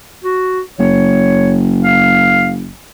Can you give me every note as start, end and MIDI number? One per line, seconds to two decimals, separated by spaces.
0.24 0.60 66
0.79 2.72 30
0.79 1.57 73
1.84 2.50 77